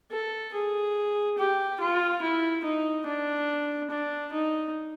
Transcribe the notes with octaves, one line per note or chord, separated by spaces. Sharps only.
A4
G#4
G4
F4
E4
D#4
D4
D4
D#4